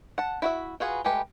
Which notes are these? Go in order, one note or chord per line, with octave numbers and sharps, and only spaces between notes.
F#5 A5
E4 F#4 E5
F4 F#4 G#4 B4
G#3 A3 G4 B4